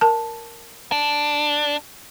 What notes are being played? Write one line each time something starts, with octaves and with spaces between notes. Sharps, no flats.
A#4 A5
D4